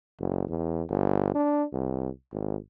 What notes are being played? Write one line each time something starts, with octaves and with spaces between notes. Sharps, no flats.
F#1
E2
G1
D4
C2
G#1